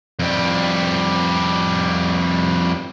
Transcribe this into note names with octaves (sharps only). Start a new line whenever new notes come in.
F2 G3